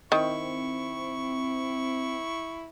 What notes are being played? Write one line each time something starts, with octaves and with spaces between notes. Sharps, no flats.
D#3 C4 E4 C#6